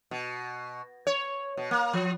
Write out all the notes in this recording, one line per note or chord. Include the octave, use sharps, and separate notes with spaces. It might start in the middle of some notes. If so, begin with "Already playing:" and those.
B2
C#5
B2
A#3
F3